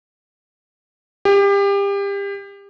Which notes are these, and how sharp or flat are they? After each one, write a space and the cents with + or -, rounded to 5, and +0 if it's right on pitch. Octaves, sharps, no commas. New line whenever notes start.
G4 +30